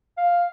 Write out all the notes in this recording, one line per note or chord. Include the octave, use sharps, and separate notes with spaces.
F5